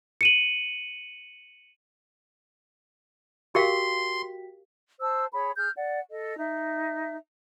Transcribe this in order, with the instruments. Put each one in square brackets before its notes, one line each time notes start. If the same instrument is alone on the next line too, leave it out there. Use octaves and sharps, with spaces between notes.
[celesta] C#7 D#7 F#7
[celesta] F#4 G5 B6 [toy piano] G4 A#4 F5 [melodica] C6
[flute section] C5 A5 E6
G#4 C#5 B5
G#4 F6 G6
D5 F#5
A4 D#5
D#4 E5